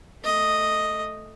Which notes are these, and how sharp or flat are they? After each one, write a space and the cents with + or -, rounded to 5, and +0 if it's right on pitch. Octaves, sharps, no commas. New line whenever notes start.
A3 +0 D#5 +0